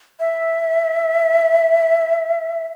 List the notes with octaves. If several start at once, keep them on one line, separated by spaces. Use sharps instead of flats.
E5